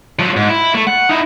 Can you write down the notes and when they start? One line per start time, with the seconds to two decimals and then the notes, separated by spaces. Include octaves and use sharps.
0.19 F3 F#3
0.36 G#2
0.49 E4
0.74 A3
0.87 F#5
1.09 D#4 E4